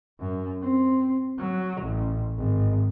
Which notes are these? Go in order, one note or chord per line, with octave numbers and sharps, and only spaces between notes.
F#2
C4
F#3
A1
G#1